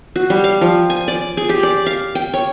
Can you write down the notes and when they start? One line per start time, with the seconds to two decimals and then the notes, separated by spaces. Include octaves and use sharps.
0.16 F#4
0.30 G3
0.44 F5
0.61 F3
0.90 G#5
1.08 D5
1.37 G#4
1.49 G4
1.63 D5
1.86 F5
2.15 G5
2.33 C#5